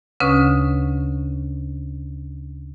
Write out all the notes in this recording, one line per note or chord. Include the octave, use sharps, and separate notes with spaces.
D2 C#3 C#4 B4 C#6 D#6